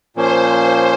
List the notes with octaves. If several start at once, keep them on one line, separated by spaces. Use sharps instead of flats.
A#2 F3 A#3 C#4 C5